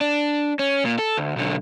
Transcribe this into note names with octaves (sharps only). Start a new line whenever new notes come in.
D4
C#4
A#2
A4
D2
B1 D3